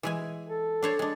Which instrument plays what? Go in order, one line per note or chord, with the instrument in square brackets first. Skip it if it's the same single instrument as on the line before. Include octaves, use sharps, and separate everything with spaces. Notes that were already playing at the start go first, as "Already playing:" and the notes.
[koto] E3 G#3 G#5
[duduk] A4
[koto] D4 C5 C#5
G#3 D4